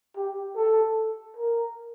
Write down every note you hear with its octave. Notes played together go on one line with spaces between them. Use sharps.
G4
A4
A#4